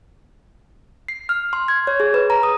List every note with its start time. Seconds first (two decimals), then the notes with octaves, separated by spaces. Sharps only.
1.08 C7
1.29 F6
1.53 C6
1.68 G#6
1.87 C#5
2.00 G#4
2.14 B4
2.30 A#5
2.43 D#6